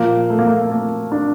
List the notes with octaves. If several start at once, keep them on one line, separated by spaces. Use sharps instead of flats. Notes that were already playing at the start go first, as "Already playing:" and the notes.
Already playing: A#2 F3 A#3
A3
A#3
A3
A#3
D4